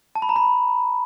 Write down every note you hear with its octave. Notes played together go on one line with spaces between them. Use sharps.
A5
B5
A#5
B5